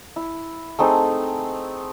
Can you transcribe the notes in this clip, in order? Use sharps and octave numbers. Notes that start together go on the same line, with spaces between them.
E4
A3 C4 D#4 G#4